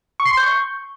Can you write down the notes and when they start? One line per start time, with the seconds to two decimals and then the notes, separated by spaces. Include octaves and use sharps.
0.20 C#6
0.26 C7
0.31 C6
0.37 G6
0.43 C#6